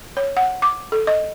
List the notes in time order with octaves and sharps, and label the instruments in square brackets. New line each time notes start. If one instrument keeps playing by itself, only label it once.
[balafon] C#5
F#5
D6
A4
D#5